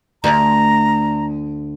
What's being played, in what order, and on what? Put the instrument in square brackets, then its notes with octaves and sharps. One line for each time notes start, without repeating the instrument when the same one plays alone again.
[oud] D2 [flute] A#5